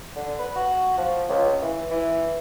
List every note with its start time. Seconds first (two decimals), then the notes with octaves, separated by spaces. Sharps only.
0.16 D3
0.39 B4
0.56 F#4
0.98 F3
1.29 C#2
1.62 E3
1.90 E3